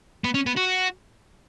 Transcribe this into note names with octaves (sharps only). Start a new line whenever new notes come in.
B3
C#4
B3
F#4